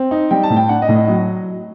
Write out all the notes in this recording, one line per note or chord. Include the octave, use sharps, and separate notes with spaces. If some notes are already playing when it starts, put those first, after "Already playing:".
Already playing: C4
D#4
G3 G5
A5
A2
G5
D4 F#5
D#5
A2
D#5
F#3 D#5